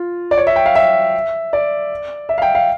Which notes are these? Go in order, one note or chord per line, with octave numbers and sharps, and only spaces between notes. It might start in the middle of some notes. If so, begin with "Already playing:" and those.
Already playing: F4
D5
C#5
E5
G5
F5
E5
D5
E5
F5
G5
F5